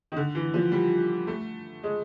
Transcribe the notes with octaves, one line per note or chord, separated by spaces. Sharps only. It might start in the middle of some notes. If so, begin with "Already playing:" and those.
D#3
D3
E3
F3
G3
A3
G#3